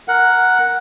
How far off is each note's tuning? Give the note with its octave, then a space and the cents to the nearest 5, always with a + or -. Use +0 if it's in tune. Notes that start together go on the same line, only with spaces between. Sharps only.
A#4 +0 F#5 +0